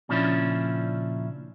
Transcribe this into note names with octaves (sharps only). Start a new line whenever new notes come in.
A#2 C#3 F3 C#4 D4 E4